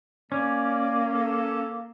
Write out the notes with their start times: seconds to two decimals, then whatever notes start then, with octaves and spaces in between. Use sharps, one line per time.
0.32 A#3 C#4 D5
1.15 A4